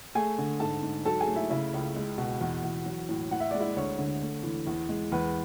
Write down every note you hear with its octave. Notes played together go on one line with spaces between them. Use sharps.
A3 G#4 G#5
D3
G#2 A4 A5
G#2
F#3 A4 A5
G#4 G#5
A3
E4 E5
C#3 E4 E5
C#2
G#3
B2
E2
E2
F#3
A2
A2 F#5
E5
G#3 D5
E4 E5
D2 C#5
D3
A3
E3
E2
G#3
E2 B4